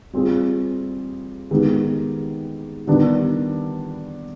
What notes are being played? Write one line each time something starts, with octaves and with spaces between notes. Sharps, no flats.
G3 C4 F4 G#4
D#3 G#3 B3 D#4 G4
D#3 G3 B3 D4